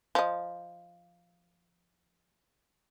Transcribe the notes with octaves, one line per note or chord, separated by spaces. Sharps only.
F3 D#5